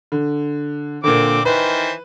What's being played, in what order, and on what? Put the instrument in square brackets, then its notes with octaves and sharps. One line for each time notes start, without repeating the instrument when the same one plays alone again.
[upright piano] D3
[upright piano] A#2 D3 [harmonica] C4 D6
[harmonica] D#3 E3 C5 [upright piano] B4